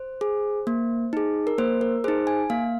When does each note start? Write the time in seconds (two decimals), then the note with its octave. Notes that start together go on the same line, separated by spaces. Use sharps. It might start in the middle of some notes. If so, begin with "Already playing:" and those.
Already playing: C5
0.21 G#4
0.67 A#3
1.13 D#4 G#4
1.47 A#4
1.58 A#3 C5
1.81 A#4
2.04 D#4 G#4 C5
2.27 G#5
2.50 A#3 F5